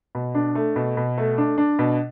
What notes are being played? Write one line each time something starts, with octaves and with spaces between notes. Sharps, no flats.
B2
D4
A3
B2
B2
A3
D4
D4
B2